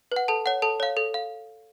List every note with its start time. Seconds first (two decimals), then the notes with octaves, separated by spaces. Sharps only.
0.12 B4 F#5
0.28 A4 A5
0.46 C#5 F#5
0.62 A4 A5
0.80 C#5 F5
0.97 A4
1.14 F5